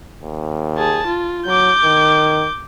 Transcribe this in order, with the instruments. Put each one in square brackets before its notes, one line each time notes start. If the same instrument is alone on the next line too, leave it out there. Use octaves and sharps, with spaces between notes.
[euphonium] D#2
[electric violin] G#4 A5
F4
[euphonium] F#3 [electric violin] D6 G6
[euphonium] D#3